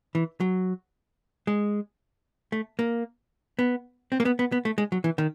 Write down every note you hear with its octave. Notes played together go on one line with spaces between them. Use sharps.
E3
F#3
G#3
A3
A#3
B3
C4
A#3
B3
B3
B3
A3
G#3
F#3
E3
D#3